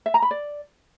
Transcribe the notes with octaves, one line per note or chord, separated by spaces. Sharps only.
E5
A#5
B5
D5